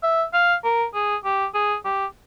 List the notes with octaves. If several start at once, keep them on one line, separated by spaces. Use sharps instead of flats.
E5
F5
A#4
G#4
G4
G#4
G4